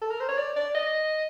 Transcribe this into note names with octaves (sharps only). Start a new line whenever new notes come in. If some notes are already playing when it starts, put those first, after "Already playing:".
A4
A#4
C5
C#5
D5
D5
D#5